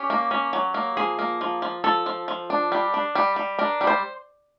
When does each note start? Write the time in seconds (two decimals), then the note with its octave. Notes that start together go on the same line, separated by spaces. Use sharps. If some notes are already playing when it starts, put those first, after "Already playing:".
Already playing: C#4 G4
0.10 A#3
0.31 C#4
0.53 F#3
0.74 A#3
0.97 F3 G#4
1.19 A#3
1.41 F3
1.62 F3
1.84 F3 A4
2.06 F3
2.28 F3
2.50 D4
2.72 G3
2.94 D4
3.15 G3
3.36 G3
3.59 D4 A#4
3.81 G3
3.87 C5